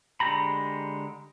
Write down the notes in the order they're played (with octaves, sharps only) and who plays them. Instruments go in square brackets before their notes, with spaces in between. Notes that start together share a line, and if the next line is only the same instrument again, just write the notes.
[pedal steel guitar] D3 G#3 G4 A#5 B5